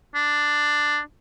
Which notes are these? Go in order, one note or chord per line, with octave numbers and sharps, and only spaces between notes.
D4